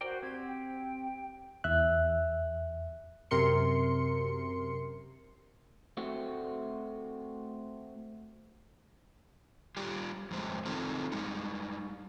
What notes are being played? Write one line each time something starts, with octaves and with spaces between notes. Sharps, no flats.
F#4 A#4 C5 D5 G5
C4 G4 G#6
G5
E2 E5 F#6
F#2 C3 A#4 C6 C#7
A3 C4 F#4
G3 F4 G4
F2 G#3 C5
D#3 C4 D#4 F4 A4
G3 G#3 D#4